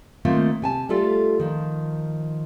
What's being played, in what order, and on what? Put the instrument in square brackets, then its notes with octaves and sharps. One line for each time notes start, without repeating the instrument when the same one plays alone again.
[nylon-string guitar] D#3 A3 A#3 C4 F4
C3 G#5 A5
G3 A3 F4 A4
D#3 F3